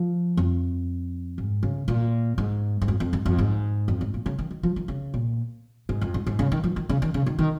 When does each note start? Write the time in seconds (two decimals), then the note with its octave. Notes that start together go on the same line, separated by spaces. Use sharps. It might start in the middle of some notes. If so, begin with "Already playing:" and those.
Already playing: F3
0.37 F2
1.38 G#2
1.63 C#3
1.88 A#2
2.38 G#2
2.82 G#2
2.88 F2
3.00 F2
3.13 G#2
3.26 F2
3.38 G#2
3.88 F2
4.01 G#2
4.14 A#2
4.26 C#3
4.39 D#3
4.51 D#3
4.63 F3
4.76 D#3
4.88 C#3
5.14 A#2
5.89 G#2
6.01 F2
6.14 G#2
6.27 G#2
6.39 C#3
6.52 D#3
6.64 F3
6.76 D#3
6.89 C#3
7.02 D#3
7.14 C#3
7.26 D#3
7.39 D#3